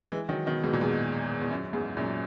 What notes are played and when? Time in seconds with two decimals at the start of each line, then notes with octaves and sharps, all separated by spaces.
0.12 E3 G#3
0.29 D#3 F#3
0.46 B2 D#3
0.64 G#2 B2
0.73 A#2
0.81 E2 G#2
1.41 E2
1.51 F#2
1.73 E2 G#2
1.97 F#2 A#2